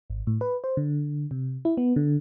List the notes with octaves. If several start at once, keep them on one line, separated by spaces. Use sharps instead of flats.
G#1
A2
B4
C5
D3
C3
E4
B3
D3